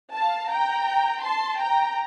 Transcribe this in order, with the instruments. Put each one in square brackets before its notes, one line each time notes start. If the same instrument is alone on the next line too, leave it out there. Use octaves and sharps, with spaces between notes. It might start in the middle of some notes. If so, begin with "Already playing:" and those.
[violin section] F5 A5
G5 A#5
A5 C6
G5 A#5